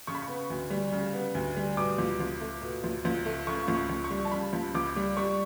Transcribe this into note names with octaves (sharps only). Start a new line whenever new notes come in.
C#3 C#6
B5
C#6
B3
D2
G3
C#3
B3
D2
G3
B2 D6
C#2
C#2
A3
B2
C#2
C#2
A3
C#3 C#6
C#2
C#6
C#2
C#6
G3
A5
C#3 B5
C#2
C#2 D6
G3
G3 C#6